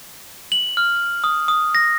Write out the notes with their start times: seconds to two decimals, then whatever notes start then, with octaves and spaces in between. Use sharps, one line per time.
0.52 F#7
0.77 F6
1.24 D#6
1.48 D#6
1.75 A#6